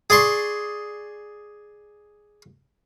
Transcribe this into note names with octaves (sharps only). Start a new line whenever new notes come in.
G#4 D5 C6 C#6